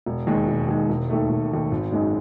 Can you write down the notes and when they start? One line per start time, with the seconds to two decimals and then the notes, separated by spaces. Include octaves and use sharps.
0.06 E1
0.27 D#2 D#3 G#3
0.48 E1
0.69 D#2 D#3 G#3
0.89 E1
1.10 D#2 D#3 A3
1.30 E1
1.51 D#2 D#3 A3
1.71 G#1
1.92 F#2 D#3 G#3 D#4